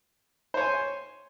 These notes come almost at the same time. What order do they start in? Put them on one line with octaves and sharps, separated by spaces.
C5 C#5 G#5 C6